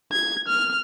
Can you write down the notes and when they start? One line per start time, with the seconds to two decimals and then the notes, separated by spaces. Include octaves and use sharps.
0.12 G#6
0.48 F6